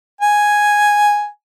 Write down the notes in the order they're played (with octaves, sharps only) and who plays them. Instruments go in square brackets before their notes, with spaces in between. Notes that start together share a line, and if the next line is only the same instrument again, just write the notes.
[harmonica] G#5